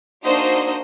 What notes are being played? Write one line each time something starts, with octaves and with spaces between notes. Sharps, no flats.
A#3 D4 D#4 F#4 C5 D#5